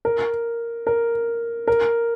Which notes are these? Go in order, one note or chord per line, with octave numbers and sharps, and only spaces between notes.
A#4
A#4
A#4